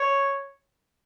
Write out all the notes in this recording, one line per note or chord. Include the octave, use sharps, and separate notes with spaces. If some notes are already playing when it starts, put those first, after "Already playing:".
Already playing: C#5